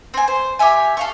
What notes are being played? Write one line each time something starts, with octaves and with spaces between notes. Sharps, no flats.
C4 G#5
C5
G4 C#5 E5 G#5
A4 F5 C#6